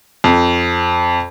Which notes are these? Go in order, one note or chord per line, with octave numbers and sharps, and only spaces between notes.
F2